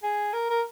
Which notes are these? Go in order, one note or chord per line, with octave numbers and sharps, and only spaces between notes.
G#4
A#4
A#4